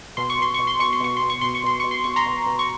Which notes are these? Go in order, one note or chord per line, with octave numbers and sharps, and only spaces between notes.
B2 C6
C#6
B2 C6
B2 C#6
C6
B2 C#6
C6
B2 C#6
B2 C6
C#6
B2 C6
C#6
B2 C6
B2 C#6
C6
B2 C#6
A#5 C6
B2
B2
C#6